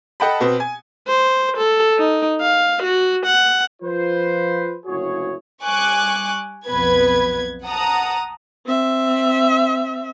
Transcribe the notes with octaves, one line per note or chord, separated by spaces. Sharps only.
A4 D#5 F#5 G5 A5 B5
B2 B3 C4
G#5
C5
A4
D#4
F5
F#4
F#5
F3 F4 B4 C5
F#1 D2 E4 F#4 G#4 C#5
G3 G#5 C#6 D6 F#6
B1 F2 B3 B4 G#6
F#5 A5 A#5 D#6
C4 E5